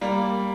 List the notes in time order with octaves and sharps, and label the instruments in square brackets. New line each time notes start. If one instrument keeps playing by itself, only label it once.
[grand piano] G3 A#3